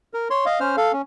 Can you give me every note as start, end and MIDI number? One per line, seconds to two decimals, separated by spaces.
0.14 0.28 70
0.30 0.45 73
0.30 0.45 84
0.46 0.60 75
0.46 0.60 77
0.60 0.76 61
0.60 0.76 72
0.60 0.76 89
0.77 0.92 69
0.77 0.92 77
0.93 1.02 61